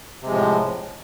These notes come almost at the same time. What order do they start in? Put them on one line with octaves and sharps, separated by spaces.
C3 G#3 F3 A2